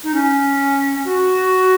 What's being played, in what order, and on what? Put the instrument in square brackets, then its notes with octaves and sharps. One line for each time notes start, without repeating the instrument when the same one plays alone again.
[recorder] D#4
C#4
F#4